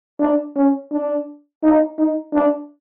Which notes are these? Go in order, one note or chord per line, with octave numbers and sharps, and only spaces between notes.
D4
C#4
D4
D#4
D#4
D4